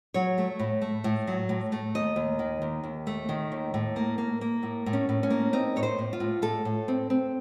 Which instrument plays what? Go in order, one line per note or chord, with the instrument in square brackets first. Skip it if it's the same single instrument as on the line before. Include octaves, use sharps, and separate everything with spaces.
[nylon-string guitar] F#3 C#5
A3
A2
A3
A2
F#3
A2
A3
D#2 D#5
D#2
D#3
D#2
D#2
A3
D#3
D#2
A2
A#3
A#3
A#3
A2
A2
C#4
A2
C#4
A#3
C4 D#4
A2 C#5
C5
A2
F4
A2
A2 A4
A2
C4
C4